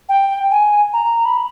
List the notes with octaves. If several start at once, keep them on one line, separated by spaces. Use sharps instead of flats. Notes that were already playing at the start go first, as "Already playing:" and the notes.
G5
G#5
A#5
B5